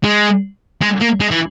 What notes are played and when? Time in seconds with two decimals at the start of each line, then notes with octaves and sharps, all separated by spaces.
0.04 G#3
0.82 G#3
1.01 A#3
1.20 G#3
1.31 E3